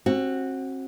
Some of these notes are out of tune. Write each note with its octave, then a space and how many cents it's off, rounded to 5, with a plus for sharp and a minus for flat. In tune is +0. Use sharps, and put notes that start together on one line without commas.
C4 +35 F#4 +0